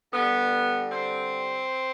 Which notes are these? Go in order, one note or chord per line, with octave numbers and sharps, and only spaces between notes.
D3 G3 B3
C4